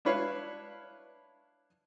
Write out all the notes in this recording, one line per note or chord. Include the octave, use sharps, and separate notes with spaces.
D4 E4 B4 C#5 F5